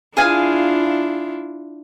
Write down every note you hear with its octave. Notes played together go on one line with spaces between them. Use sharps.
D4 E4 F4 G#4 F5 G#5